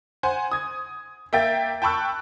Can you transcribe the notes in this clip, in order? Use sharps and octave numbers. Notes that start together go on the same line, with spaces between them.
C5 F#5 G#5
D#6 G#6
A#3 E5 G5 A6
G5 A5 B5 C#6 E6 F#6